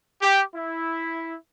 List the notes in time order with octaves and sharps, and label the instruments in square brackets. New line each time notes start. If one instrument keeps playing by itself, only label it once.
[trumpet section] G4
E4